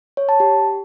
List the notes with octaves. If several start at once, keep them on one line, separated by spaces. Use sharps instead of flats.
C#5
A5
G4